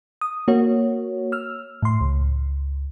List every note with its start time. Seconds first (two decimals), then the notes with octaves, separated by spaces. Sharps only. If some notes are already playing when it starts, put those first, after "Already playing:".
0.21 D#6
0.48 A#3 F#4 C#5
1.32 E6 F6
1.82 A2 C6
2.01 C#2